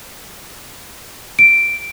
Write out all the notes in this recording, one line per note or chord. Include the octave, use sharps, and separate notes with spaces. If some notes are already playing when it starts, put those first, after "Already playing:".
D7